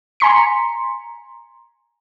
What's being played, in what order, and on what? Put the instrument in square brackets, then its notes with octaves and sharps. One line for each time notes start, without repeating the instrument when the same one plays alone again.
[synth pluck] G#5 A#5 C6 B6 C#7